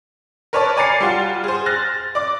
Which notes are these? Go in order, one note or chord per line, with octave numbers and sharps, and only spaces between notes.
A#4 B4 C#5 D5 A5
D5 G#5 A#5 A6 C7 C#7
G3 F4 F#4
G#4 C5
F6 F#6 A6 A#6
D5 D6